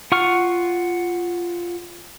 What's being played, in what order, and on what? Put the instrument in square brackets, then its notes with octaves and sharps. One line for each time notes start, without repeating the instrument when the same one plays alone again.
[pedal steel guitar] F4 F#5 C#6 F6